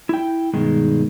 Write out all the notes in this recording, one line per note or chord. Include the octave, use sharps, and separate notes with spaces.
E4 G5
G2 B2 D#3 G#3